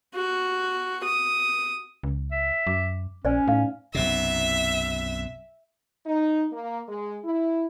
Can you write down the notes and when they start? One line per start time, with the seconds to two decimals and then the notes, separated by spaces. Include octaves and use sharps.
0.15 F#4
1.04 D#6
2.03 C#2
2.32 E5
2.67 F#2 D6
3.25 A#1 C#4 C5 D5 G#5
3.48 A2 D#4 F5
3.95 B1 F#2 C3 E5
6.06 D#4
6.53 A#3
6.88 G#3
7.25 E4